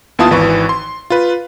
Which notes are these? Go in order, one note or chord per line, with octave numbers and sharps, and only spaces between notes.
D#2 B3 E4 F4 A5 D#6
G#1 E3 B4 C#6
C6
F4 B4